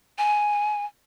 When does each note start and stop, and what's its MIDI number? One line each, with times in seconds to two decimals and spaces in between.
0.18 0.85 80